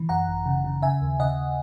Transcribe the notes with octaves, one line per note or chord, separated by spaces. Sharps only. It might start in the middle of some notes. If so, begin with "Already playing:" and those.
Already playing: E3
F#2 F#5 A#5
G#1
C#3
C#3
C#3 E5 G#5
D#2
C#3 D#5 F#5